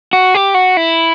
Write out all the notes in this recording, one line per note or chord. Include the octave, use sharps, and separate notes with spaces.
F#4
G4
F#4
E4